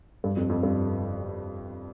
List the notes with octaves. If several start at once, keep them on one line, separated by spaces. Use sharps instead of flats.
G2
F2
F2
G2